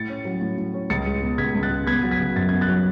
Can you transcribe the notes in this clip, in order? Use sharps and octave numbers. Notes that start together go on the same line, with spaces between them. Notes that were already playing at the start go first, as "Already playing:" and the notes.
Already playing: A2 A6 C#7
C#4
F#3
A2
A2
C#4
C#2 A6 C#7
G#3
B2
C#2 G#6 B6
C#2
F#6 A6
G#3
B3 G#6 B6
F#3
G#6 B6
C#3
F#2 A6
B3 G#6
F#6 A6
F#3